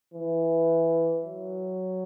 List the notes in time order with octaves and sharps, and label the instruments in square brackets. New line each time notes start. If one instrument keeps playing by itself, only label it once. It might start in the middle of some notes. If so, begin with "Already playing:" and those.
[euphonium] E3
F#3